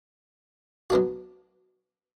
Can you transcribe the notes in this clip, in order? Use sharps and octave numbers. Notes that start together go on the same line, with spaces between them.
F#3 B3 D4 F#4